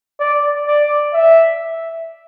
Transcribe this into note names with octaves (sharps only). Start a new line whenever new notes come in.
D5
D5
E5